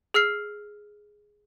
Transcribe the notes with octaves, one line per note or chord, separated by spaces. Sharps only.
G#4 E6 F6 C7